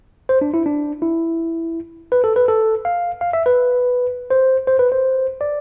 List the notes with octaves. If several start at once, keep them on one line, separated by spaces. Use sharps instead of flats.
C5
D4
E4
D4
E4
B4
A4
B4
A4
F5
F5
E5
B4
C5
C5
B4
C5
D5